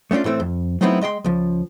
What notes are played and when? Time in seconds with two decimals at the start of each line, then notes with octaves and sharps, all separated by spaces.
0.11 A3 B3 C#4 D4 F4
0.24 A2 E3 A3 C4
0.40 F2
0.81 F#3 A3 B3 C4 D#4 E4
1.01 G#3 D#5 G5 C6
1.24 C#2 F3